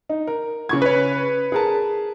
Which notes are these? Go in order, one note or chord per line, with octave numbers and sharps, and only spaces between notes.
D#4
A#4
C#3 C#6 G#6
B4 C#5
G#4 A#4 A5